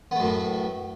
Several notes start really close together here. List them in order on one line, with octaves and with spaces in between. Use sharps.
B3 A3 F#2 A2